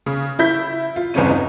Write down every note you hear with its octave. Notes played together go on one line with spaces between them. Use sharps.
C#3
E4 G6 B6
F4
G1 E2 C#3 C4 C#4 D#7
D#4